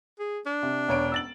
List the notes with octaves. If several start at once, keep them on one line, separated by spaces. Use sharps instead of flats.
G#4
D4
C3
E1 C#5 D7
E6 A6 F#7